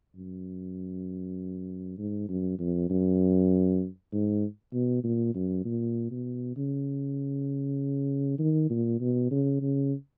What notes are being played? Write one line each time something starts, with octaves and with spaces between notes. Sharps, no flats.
F#2
G#2
F#2
F2
F#2
G#2
B2
A#2
F#2
A#2
B2
C#3
D#3
A#2
B2
C#3
C#3